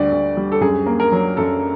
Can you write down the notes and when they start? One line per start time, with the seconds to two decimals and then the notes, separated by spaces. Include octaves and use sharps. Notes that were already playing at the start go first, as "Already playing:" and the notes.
Already playing: D2 D3 G3 D5
0.12 D2
0.37 G3
0.52 A4
0.61 F#2 G#4
0.86 A#3
1.00 A#4
1.12 F#3
1.37 F#2 A4